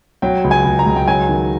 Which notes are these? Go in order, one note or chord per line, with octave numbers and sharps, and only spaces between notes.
F#3 G5
C#2
G#5
C#2
A#5
C#2
G5
F#3 G#5
D#3